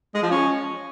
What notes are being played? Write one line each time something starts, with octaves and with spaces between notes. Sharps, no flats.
G#3
F3
C#4